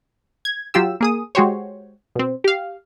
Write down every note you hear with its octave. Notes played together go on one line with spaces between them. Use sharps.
G#6
F#3 F4 G4 E6
A#3 G#4 D#6
G#3 F#4 G4 C5 C#5
B2 C4
G4 F5